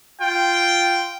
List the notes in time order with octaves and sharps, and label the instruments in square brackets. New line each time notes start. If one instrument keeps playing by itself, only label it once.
[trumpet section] F4 G5